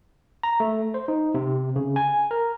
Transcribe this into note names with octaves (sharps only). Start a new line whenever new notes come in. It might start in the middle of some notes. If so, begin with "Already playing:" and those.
A#5
A3
C5
D#4
C3
C#3
G#5
A#4